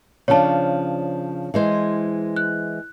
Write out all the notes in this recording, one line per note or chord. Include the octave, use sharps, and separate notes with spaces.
C#3 F3 D4 C#5 A5
E3 G#3 C5
F#6